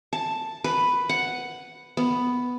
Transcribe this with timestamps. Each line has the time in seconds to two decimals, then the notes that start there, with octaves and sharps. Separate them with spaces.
0.13 A5
0.64 B4
1.09 F#5
1.97 B3